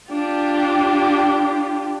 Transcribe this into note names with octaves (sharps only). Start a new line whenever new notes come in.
D4 F4 G4